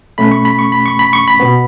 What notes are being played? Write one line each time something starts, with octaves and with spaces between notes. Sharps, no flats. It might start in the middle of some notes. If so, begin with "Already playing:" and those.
B2 A3 C#4 B5
C#6
B5
C#6
B5
C#6
B5
C#6
B5
B2 B3